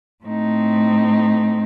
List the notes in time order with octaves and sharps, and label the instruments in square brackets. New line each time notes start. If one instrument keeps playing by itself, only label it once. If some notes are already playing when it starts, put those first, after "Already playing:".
[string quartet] A2 A3 C4 D#4